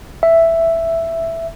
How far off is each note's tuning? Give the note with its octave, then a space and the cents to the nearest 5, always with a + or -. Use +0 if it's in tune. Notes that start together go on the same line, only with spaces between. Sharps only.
E5 +5